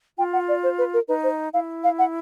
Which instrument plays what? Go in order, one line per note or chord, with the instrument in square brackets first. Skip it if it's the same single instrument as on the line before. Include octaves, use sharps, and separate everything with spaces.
[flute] F4 [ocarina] G5
[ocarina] F#5
D5
C5
B4
A#4
[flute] D#4 [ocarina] B4
[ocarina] C5
[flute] E4 [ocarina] F5
[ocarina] F5
F#5